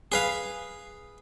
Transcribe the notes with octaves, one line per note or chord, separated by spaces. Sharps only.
G#4 B4 F5